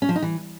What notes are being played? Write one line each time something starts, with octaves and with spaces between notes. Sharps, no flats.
C#4
F3
D#4
E3